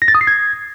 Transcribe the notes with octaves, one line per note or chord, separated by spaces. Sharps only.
A#6
A6
D#6
C7
G#6